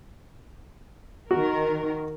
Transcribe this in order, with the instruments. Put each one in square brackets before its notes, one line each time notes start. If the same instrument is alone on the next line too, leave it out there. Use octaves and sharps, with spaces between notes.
[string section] D#3 A#4 [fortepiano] F#4